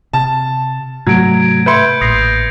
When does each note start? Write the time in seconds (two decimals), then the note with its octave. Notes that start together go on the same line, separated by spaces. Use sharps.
0.13 C3 A5
1.07 G#2 C3 F#3 A3 G#6 D7
1.66 B4 E5 C6 G6 G#6 C#7
2.01 A1 A#2 D#6 A#6 C7